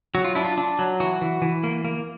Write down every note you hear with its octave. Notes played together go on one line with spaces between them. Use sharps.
F#3 F#4
F4
D4 E4
F4
D4
F#3
E3 F#4
E3
E3
A#3
A#3